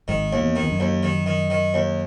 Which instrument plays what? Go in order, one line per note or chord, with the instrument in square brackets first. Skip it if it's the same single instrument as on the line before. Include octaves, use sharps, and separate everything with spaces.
[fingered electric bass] G#1 G#2 [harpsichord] D#3
[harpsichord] D#2
[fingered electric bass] E2
[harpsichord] D#3
[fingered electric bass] E2
F#2
[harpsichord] D#2
D#3
D#3
D#3
D#2